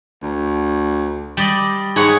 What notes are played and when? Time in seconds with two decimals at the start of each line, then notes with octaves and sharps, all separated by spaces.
0.22 D2
1.37 G3 D5 D#5
1.96 G#2 G#4 C#5 F#5